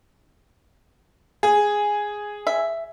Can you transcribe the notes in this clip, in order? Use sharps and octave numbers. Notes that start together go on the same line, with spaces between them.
G#4
E5